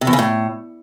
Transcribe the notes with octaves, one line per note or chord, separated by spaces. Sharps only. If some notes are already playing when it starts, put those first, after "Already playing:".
C3
E2
C#3
A2